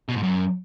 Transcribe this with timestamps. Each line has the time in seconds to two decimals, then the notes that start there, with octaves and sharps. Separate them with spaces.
0.09 B2
0.16 G#2
0.23 F#2